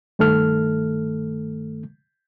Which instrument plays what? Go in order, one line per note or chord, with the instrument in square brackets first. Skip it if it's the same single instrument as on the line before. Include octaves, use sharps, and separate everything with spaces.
[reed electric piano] G2 D#3 A3 A4 F6